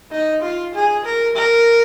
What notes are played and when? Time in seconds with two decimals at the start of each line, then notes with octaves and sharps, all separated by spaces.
0.12 D#4
0.42 F4
0.74 G#4
1.05 A#4
1.36 A#4